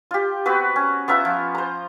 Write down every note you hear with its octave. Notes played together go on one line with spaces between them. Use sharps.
F4 G4
B3 C4 F#4 B4
C#4
B3 F4 E5 A#5
F3
C5 A#5